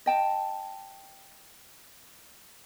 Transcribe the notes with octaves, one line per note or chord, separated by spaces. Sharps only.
D#5 G5 A5